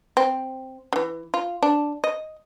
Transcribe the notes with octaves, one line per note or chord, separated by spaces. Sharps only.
C4
D3 E3
F4
D4
D#5